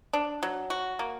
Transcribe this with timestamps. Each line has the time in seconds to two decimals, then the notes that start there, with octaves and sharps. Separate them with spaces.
0.13 D4
0.43 F#3
0.70 F#4
0.99 A#3